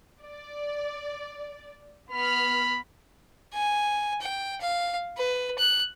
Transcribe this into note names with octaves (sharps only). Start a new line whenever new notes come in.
D5
B3 B5 F6
G#5
G5
F5
B4
F#6